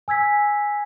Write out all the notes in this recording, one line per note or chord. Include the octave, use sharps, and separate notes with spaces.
G#5 E6 G#6 B6